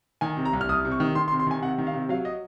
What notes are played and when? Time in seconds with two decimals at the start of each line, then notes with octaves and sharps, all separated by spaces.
0.21 D#3 G#5
0.37 C3
0.45 A#5
0.53 C2
0.61 F6
0.69 C2 D#6
0.85 C3
0.92 C#6
1.00 D#3
1.15 D#3 C6
1.28 C6
1.32 C3
1.40 C6
1.47 D#3 G#5
1.62 C3 F#5
1.78 D#3
1.87 F5
1.93 C3
2.09 F#3 F5
2.25 D#5